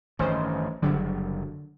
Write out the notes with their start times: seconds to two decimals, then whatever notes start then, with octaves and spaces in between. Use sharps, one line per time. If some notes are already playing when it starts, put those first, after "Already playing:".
0.19 A1 G2 D#3 C#4 C5 D#5
0.82 F#1 D3 F#3 G3